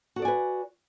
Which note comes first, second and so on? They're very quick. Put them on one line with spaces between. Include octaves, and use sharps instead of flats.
F#4 A4 D5 G#5 B4